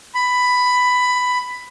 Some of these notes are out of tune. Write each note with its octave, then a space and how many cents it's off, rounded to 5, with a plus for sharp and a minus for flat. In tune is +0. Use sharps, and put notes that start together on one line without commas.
B5 +10